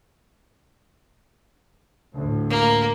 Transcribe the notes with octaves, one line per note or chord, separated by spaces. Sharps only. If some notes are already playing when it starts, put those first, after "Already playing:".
D2 A2
A#3